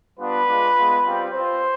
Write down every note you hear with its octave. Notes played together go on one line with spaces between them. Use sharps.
G3 B3 D4 F4 B4
G#3 D4 F4
G#3 B3 F4
G3 C4 F4
C4 F4 C5